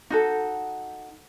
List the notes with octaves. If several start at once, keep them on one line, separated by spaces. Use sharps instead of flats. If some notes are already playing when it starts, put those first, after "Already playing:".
D#4 F#4 A4